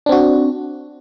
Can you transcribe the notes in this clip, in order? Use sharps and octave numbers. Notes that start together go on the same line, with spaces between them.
C4 D4 F#4